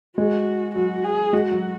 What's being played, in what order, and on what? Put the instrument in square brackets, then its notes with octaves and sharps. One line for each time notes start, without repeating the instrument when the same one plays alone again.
[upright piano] G#3 [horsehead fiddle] F#4
[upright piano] F#3 [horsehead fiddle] F#4
[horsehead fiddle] G#4
[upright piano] G#3 [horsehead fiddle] F#4
[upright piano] F#3